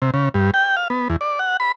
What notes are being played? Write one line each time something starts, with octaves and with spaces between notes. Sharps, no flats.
C3
C#3
G2
G5
F5
B3
E2
D5
F#5
B5